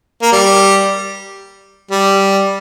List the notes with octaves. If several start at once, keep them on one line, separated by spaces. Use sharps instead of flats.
A#3
G3
G3